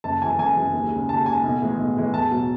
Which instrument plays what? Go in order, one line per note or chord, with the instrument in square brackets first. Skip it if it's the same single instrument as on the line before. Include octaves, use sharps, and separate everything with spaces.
[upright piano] F#1 A5
F#2 E3 G#3 G#5
F#1 G#5
F#2 E3 G#3
D#2
C#3 G#3
D#2 A5
C#3 G#3 G#5
B1
A2 E3 G#3
B1
A2 E3 G#3
E2 A5
B2 F#3